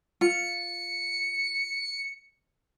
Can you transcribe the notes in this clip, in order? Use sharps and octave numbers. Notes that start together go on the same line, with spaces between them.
F4 C#7